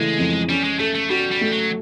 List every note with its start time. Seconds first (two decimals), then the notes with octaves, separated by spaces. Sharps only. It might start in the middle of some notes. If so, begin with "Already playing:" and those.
Already playing: C#3 E3 G#3 A3
0.19 F2
0.49 G3 C#4
0.64 G#3
0.79 A3 A4
0.95 A3
1.10 G3 F#4
1.31 G3
1.41 A3
1.51 F#3